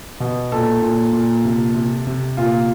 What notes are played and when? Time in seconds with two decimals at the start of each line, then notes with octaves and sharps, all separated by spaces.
0.20 B2
0.52 A#2 A4
0.82 A#2
1.13 A#2
1.45 C3
1.75 C3
2.07 C3
2.37 A#2 F4